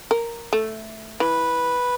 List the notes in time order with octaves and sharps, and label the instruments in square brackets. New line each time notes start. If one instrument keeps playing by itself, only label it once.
[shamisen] A#4
A3
[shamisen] E3 [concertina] B4